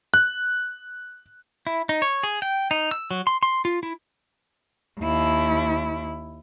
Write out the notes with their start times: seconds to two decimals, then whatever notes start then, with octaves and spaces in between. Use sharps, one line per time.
0.14 F#6
1.67 E4
1.89 D#4
2.02 C#5
2.23 G#4
2.42 G5
2.71 D#4
2.91 E6
3.11 F#3
3.27 C6
3.43 C6
3.65 F4
3.83 E4
4.99 D#2 E4